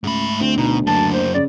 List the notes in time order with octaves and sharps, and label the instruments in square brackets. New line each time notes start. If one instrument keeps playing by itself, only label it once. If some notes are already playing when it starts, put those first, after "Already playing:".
[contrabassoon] C#2 [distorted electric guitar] G#2 B5 [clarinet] A3
[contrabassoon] D2 [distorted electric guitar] C4
[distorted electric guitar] B2 [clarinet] D#4
[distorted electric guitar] F#2 A#3 [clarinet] A5
[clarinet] C5
[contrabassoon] C#3 [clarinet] D5